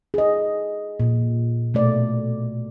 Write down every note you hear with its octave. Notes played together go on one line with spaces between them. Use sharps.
G#4 D#5
A#2
B2 A3 D5